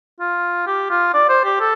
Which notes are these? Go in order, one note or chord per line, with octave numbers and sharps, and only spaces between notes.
F4
G4
F4
D5
C5
G4
A4